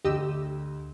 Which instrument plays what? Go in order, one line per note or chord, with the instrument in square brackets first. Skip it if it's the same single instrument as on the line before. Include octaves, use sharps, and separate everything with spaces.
[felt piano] D2 [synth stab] G4 D#5 E6